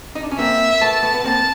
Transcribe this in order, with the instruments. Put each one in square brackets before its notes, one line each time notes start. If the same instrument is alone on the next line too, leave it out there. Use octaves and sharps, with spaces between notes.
[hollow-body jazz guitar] D#4
D4
C#4
[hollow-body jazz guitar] A#3 C4 [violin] E5
[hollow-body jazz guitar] A3 B3 [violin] A5
[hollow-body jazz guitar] A3 B3
B3
[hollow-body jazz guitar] A#3 C4 [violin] A5